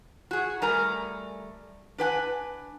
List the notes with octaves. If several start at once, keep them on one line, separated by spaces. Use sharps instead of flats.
F#4 G#4
G3 A3 A#4 G#5 A#5
D4 B4 G5 G#5